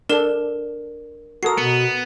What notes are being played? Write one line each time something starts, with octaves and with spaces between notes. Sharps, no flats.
D4 A4 A#4 E7 G7
F#4 A4 A#4 D#6 C7
B2 B3 C#7